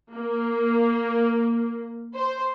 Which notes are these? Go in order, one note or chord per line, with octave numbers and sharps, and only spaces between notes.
A#3
C5